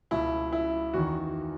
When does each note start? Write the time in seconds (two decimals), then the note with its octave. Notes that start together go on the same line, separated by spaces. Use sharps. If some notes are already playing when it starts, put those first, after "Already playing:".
0.11 C#2 B2 E4
0.53 E4
0.93 E2 D#3 F#4